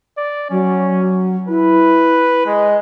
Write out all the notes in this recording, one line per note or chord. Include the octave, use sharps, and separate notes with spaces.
D5
F#3 C#4
E4 B4
G#3 D#5